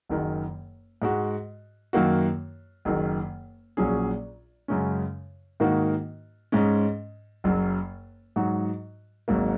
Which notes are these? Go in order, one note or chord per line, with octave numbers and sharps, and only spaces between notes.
F#1 F#2 D#3
G#2 G#3 F#4
F#2 D#3 A#3 F#4
F#1 F#2 D#3
A#1 A#2 F#3 C#4 G#4
F#2 C#3 G#3 C#4
G#2 D#3 A#3 D#4 F#4
G#2 G#3 C#4
F#1 F#2 F#3
G#2 F#3 D#4 F#4
G#1 G#2 F#3 A#3